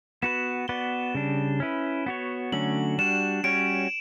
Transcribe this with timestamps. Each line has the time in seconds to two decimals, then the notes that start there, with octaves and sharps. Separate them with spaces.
0.22 B3 F#4 B4 E7
0.68 B3 F#4 B4 D5 G7
1.15 C#3 G3 D4
1.60 C#4 E4 B4
2.06 B3 F#4 C#5
2.52 D3 F#3 A3 C#4 F#7
2.98 G3 D4 F#4 E7
3.44 G3 C#4 F#4 C#5 D7